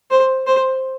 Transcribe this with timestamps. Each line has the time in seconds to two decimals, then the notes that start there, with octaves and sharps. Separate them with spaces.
0.11 C5
0.47 C5